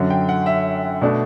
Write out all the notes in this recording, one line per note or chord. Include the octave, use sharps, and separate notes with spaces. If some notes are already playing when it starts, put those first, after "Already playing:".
Already playing: F#2 D3 F#3 C#4
G5
F#5
E5
B2 A3 D4